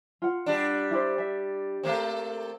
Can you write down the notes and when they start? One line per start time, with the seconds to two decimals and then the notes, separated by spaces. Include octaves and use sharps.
0.22 F4 F#5
0.46 G3 D4
0.91 E4 G4 C5
1.18 E5
1.83 A3 A#3 C4